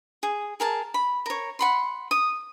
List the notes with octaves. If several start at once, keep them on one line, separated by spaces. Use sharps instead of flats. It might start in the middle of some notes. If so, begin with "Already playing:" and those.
G#4
G#4 A#4 A5
B5
A#4 C#5
F#5 B5 C6
D#6